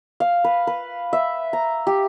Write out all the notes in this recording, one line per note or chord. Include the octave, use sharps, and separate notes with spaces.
F5
B4
B4
E5
A#5
G4